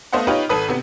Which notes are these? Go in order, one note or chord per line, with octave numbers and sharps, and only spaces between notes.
A3 B3 C5 D#5 F5 F#5
D#4 F4 G4 B4 C#5
G#1 A4 B4 D#6
C3 B3